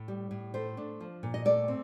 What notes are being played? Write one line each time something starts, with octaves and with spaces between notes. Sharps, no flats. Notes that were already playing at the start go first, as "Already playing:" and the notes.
Already playing: A2
G3
A2
A3 C5
D4
F3
A#2
D#5
A3 D5
C4